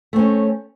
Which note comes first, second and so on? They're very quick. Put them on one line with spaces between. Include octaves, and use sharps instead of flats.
A3 C4 C#4